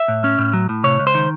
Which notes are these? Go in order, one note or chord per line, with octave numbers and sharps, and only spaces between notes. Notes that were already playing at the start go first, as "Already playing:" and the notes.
Already playing: E5
A2
C#4
A2
F#3
A2
C3 C#5
C#2
C5
D#3